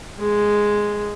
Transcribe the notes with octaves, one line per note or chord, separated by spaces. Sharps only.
G#3